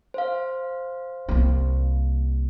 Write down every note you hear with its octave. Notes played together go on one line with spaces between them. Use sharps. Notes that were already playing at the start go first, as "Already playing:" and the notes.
C5 F5
C2 A#3